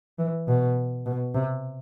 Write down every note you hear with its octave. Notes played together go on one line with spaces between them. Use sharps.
E3
B2
B2
C3